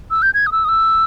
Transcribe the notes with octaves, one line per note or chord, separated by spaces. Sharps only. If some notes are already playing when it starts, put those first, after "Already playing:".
E6
G6
G#6
D#6
E6
D#6
E6